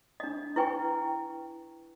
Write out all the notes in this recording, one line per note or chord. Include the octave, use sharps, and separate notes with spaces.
D4 D#5
E4 B4 G5 G#5 C#6